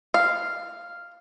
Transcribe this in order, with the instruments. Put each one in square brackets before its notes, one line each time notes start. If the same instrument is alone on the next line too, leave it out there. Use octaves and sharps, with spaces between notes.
[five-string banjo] F5